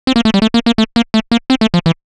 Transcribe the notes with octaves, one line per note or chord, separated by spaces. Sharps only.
C4
A#3
A3
G3
A3
A#3
A#3
A3
A#3
A3
A#3
C4
A3
F3
E3